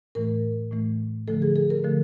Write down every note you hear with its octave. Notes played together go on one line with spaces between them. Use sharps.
A2 E3 A3 A#4
A2 E3 A3
D3 F3 A3 A4
G#4
A4
A#4
D3 F3 A3